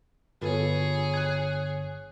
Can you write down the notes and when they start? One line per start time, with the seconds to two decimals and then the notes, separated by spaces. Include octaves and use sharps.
0.41 G1 F4 G#4 A4 B4 C#5
1.14 F#6 G#6